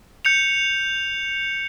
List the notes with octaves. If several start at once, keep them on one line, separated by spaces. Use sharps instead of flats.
G6 C#7 F7